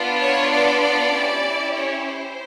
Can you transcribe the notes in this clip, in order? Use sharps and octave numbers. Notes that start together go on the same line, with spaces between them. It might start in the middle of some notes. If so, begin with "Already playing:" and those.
Already playing: B3 D4 F4
C#5
D5
D5
C#4 E4 G4
C#5
C5